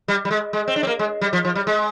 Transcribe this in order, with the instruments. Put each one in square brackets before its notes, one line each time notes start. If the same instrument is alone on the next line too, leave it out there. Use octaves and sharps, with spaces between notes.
[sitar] G3
G3
G#3
G#3
C4
D4
C4
A#3
G#3
G3
F3
F3
G3
G#3